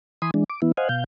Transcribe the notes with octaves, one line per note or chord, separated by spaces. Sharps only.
E3 G#5 B5 C6 D#6
E3 G#3 D4
D6
E3 B3 E4
C5 D#5 F5 F#5 G#5
B2 F5 G6